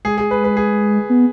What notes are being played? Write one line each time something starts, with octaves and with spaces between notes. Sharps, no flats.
G#3 G#4
G#4
B4
B4
G#4
B3